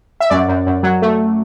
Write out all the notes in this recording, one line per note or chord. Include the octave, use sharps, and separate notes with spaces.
E5
F#2 D5
F#2
F#2
F#3
A3